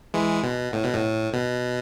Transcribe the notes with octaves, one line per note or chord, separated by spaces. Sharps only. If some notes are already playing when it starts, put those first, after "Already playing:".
E3 G#3
B2
A2
B2
A2
B2